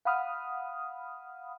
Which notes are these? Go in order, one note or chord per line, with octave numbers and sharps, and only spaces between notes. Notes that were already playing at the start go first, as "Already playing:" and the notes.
F5 F#5 B5 D#6 F6